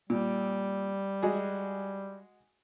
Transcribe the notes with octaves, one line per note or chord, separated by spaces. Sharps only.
A#2 G3
G#3 F#4 G#4